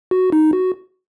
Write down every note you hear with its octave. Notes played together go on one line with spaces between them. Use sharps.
F#4
D#4
F#4